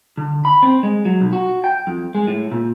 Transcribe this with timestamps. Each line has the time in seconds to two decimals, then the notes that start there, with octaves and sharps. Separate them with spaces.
0.17 D3
0.45 B5
0.62 C4
0.83 G#3
1.05 F#3
1.21 B1
1.33 F#4
1.64 G5
1.87 F2
2.15 G#3
2.28 A2
2.52 A#2